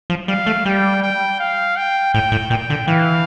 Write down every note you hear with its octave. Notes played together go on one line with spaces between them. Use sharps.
F3
G3 F5
A3
G3 G5
G5
F5
G5
A2 G5
A2
A#2 G5
D3
E3 F5